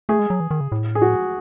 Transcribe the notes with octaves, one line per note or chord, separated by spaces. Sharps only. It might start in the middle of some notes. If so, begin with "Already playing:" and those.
A3 G#4
G#3
F#3
E3
D#3
C#3
A2
G#4
F#4